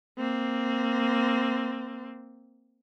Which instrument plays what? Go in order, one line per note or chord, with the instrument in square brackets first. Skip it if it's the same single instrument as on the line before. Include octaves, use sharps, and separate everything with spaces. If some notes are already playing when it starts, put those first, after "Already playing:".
[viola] A#3 C4